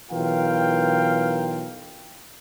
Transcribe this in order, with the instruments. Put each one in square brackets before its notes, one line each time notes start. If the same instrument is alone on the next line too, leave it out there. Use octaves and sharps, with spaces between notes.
[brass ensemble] B1 E3 F4 A#4 F5 G5